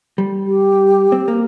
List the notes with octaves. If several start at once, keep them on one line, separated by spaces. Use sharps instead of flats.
G3
G4
C4
A#3